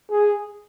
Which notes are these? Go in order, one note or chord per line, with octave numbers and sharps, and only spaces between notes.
G#4